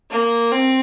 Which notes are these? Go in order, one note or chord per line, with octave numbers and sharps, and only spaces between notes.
A#3
C4